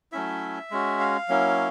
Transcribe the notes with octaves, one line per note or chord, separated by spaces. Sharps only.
F#3 A3 C#4 E4 E5
G#3 C#4 F#4
F5
F#3 A#3 C#4 E4